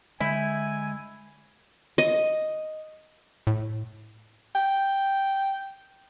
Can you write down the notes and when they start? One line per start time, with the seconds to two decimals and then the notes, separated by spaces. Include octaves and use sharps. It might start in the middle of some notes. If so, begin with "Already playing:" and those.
0.20 D3 G#3 E4 E5 G#5 G6
1.98 D#5
3.47 A2
4.55 G5